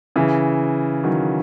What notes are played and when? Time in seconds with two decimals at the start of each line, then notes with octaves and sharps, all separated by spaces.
0.16 C#3 E3
1.04 D#3 F#3